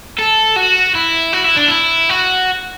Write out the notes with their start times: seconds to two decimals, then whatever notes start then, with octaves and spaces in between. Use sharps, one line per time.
0.19 A4
0.56 F#4
0.95 E4
1.33 F#4
1.44 E4
1.57 D4
1.68 E4
2.09 F#4